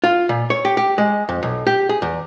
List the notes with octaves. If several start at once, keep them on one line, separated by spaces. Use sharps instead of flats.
F4
A#2
C#5
G4
G4
G#3
F2
B1
G4
G#4
E2